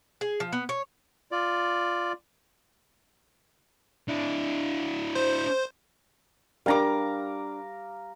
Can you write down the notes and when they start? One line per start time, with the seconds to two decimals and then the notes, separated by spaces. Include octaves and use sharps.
0.21 G#4
0.40 F3
0.53 B3
0.69 C#5
1.32 F4 D5
4.08 D4 E4
5.15 C5
6.66 G3 D4 A#4 F5 A#5 D6